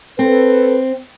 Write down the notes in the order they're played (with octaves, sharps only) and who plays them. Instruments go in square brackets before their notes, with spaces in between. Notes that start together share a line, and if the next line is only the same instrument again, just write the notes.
[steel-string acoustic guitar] C4 [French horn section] A4 B4